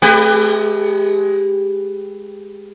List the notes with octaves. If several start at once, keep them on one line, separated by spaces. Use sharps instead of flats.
G#3 G4 B4